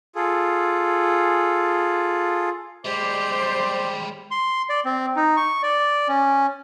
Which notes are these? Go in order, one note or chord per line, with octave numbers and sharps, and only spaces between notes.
F4 G#4 A4
G3 G#3 G4 C5 D5
C6
D5
C4
D#4
C#6
D5
C#4